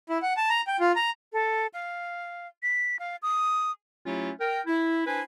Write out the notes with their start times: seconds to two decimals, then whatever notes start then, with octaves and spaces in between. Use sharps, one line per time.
0.09 E4
0.22 F#5
0.37 A5
0.50 A#5
0.67 G5
0.80 F4
0.96 A#5
1.33 A4
1.74 F5
2.63 B6
2.99 F5
3.23 D#6
4.06 F#3 A3 C#4 E4 F4 G4
4.40 A#4 G5
4.67 E4
5.06 D4 E4 B4 C5 G#5